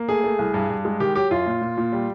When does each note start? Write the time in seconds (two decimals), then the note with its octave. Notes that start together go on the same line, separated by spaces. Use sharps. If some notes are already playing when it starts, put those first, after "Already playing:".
Already playing: A#3
0.08 A3 G#4
0.24 A3
0.39 C2
0.54 G2
0.70 G2
0.85 G#3
1.00 D#3 G4
1.15 F#3 G4
1.31 F#2 F4
1.46 A#2
1.62 A#2
1.77 A#2
1.93 G3